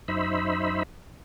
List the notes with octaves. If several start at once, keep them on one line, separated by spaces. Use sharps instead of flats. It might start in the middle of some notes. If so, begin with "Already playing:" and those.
F#2 D#4 C5 E5 B5